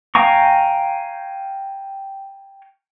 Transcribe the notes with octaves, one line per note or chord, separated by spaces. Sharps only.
F5 G5 G#5 A#5 C#6